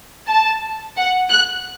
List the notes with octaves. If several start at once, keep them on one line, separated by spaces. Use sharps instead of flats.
A5
F#5
F#6